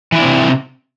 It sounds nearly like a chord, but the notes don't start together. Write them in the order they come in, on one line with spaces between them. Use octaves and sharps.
E3 E4 D4 C4 C3